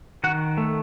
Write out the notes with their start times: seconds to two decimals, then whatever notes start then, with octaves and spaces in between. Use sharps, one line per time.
0.24 D#3 F#4 F#5
0.57 A3